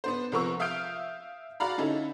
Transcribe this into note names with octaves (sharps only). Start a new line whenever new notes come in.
B3 D4 C5
C2 F3 A#4 B4 C#6 E6
E5 F5 D#6 F6 G6 D7
F#4 D5 F5 A#5 B5
D3 C#4 D#4 E4 A4